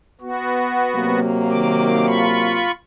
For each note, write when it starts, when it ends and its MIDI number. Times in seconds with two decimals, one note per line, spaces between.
0.21 1.20 59
0.21 1.20 66
0.95 2.69 48
0.95 2.69 54
0.95 2.69 58
1.49 2.06 51
1.49 2.06 86
2.07 2.71 65
2.07 2.71 83
2.07 2.71 85